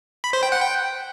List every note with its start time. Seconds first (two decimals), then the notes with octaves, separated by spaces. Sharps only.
0.24 B5
0.33 C5
0.43 G5
0.52 F#5
0.61 G5